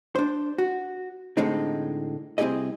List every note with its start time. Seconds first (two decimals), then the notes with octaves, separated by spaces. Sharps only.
0.15 D4 C5
0.58 F#4
1.37 A2 D3 G#3 C4 D#4
2.38 C2 C4 E4 G4 G#4 D#5